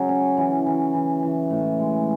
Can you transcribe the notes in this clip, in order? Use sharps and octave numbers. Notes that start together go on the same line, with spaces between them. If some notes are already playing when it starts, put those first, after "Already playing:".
Already playing: C#3 F#3
C#4
E3
E3
E3
E3
A2
G#3